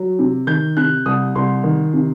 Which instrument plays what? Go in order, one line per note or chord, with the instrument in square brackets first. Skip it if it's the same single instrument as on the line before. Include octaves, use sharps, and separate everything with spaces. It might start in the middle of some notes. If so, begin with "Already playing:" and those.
Already playing: [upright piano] F#3
C3
D#3 G6
C3 F#6
C2 D#6
C2 C6
D#3
C3